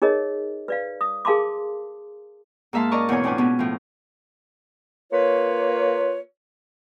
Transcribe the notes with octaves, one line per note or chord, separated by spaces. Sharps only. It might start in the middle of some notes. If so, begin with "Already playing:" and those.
D#4 G#4 A#4 C#5 D#5
B4 D5 F5
D#6
G#4 A#4 F5 A5 C6 D6
G#2 A#3 E5 F5 A5 C6
C#4 A#4 D5 D#5 A#5 C#6
E2 B2 C#5 G#5
A2 C4 D4 F4 B4 G#5
B2 B3 C#4
A2 F3
A#3 F4 B4 C#5